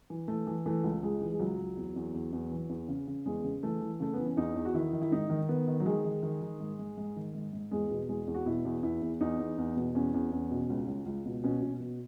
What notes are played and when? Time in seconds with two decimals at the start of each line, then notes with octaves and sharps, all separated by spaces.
0.10 E3
0.28 E3 A3
0.47 E3
0.66 E3 A3
0.84 C#2
1.02 C#2 G#3
1.21 E3
1.32 G#3
1.39 C#2 F#3
1.59 C#2
1.77 E2
1.96 E2
2.14 E2
2.33 E2
2.52 E3
2.69 E2
2.88 C#3
3.07 C#3
3.26 E2 G#3
3.44 C#3
3.63 E3 A3
3.81 E3
4.00 C#3 A3
4.14 E3 B3
4.26 C#4
4.37 E2 D#4
4.56 E2
4.65 F#4
4.74 D#3 E4
4.93 D#3
5.02 E4
5.11 G#2 D#4
5.30 D#3
5.49 D#3 B3
5.68 D#3
5.80 F#3
5.86 D#3 G#3
6.04 D#3
6.23 D#3
6.42 D#3
6.60 G#2
6.79 G#2
6.98 G#2
7.16 D#3
7.35 G#2
7.53 G#2
7.71 E2 G#3
7.90 B2
8.09 E2 G#3
8.27 E2
8.34 F#4
8.46 B2 E4
8.65 E2
8.83 E2 E4
9.02 E2
9.21 E2 D#4
9.39 E2
9.58 E2
9.77 B2
9.95 E2 C#4
10.14 E2
10.32 E2
10.51 B2
10.70 C#2
10.88 C#2
11.06 C#2
11.25 B2
11.44 B2 C#4
11.63 B2
11.80 B2